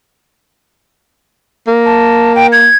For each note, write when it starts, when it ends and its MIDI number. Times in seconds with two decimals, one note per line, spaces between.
1.67 2.69 58
1.86 2.33 81
2.36 2.47 79
2.52 2.77 92